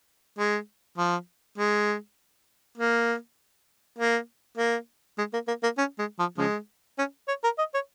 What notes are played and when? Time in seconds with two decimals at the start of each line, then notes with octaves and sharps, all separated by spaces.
0.38 G#3
0.98 F3
1.58 G#3
2.78 A#3
3.98 A#3
4.58 A#3
5.18 G#3
5.34 A#3
5.48 A#3
5.63 A#3
5.78 C#4
5.99 G#3
6.19 F3
6.38 C#3 F3 G#3
6.98 C#4
7.28 C#5
7.44 A#4
7.58 D#5
7.74 C#5